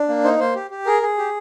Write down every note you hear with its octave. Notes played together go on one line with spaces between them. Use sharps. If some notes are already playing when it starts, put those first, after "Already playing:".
Already playing: D4
A#3
D#4 C5
A#3 C5
G4
G4
G#4 A#4
G#4
G4